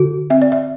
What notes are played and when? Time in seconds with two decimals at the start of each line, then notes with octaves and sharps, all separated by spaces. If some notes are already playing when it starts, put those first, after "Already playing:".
Already playing: D3 F#4
0.30 C4 E5
0.42 D5
0.52 E5